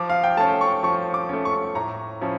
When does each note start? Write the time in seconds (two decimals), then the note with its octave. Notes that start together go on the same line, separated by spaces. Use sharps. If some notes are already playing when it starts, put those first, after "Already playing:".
Already playing: F3 D6
0.10 F5
0.24 G5
0.37 A3 C#4 A5
0.61 C#6
0.83 F3 C#6
1.14 D6
1.29 A3 C#4
1.45 C#6
1.75 A2 A#5
2.21 F3 C#4 E4